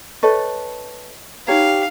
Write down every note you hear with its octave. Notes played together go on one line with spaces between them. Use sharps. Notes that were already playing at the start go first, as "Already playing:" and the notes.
A4 B4 C#5 D#5 C#6
D#4 G4 C#5 F5 A#5